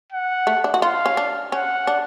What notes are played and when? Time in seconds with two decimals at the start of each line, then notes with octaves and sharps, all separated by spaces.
0.12 F#5
0.47 A3
0.64 D4
0.74 F#4
0.82 F4 F5
1.06 C#4
1.17 D4
1.52 C#4 F#5
1.87 D4